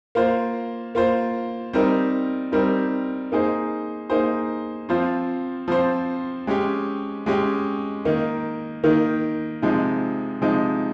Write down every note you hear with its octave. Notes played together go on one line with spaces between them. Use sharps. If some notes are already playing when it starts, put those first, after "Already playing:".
A#3 F4 C5
A#3 F4 C5
G3 C4 D#4 A#4
G3 C4 D#4 A#4
A#3 D#4 G#4 C5
A#3 D#4 G#4 C5
F3 C4 F4 C5
F3 C4 F4 C5
G#3 C#4 G4
G#3 C#4 G4
D#3 A#3 D#4
D#3 A#3 D#4
C3 F3 G#3 D#4
C3 F3 G#3 D#4